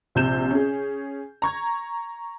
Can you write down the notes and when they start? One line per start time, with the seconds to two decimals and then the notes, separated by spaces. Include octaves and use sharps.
0.15 A#1 C3 G6 E7
0.51 C#4 G#4
1.42 A#5 C#6 G#6